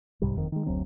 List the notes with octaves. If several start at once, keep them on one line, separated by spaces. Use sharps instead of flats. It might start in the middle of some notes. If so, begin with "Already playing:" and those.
C2 G#2 C3 G3
F#1 F2 D#3
D#3 G#3
F#1 D2 F#3 C4